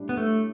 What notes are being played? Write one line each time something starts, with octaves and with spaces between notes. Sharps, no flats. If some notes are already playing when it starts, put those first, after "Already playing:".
Already playing: A2 G3 D4
B3
A3